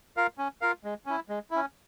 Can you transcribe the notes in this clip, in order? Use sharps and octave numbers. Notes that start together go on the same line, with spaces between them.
F4 A#4 F5
C#4
F4 A#4 F5
G#3
C#4 E4
G#3
C#4 E4